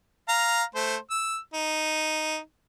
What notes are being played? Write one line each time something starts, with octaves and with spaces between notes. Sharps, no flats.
F5 A#5
A3 C5
E6
D#4